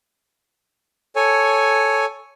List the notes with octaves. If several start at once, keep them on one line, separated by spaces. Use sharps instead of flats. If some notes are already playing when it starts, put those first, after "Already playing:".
A4 C#5 G#5